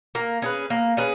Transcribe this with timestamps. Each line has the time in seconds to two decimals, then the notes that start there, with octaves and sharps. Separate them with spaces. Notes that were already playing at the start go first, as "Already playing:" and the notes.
0.15 A#3
0.42 C#4 G#4 B4
0.70 A#3
0.97 C#4 G#4 B4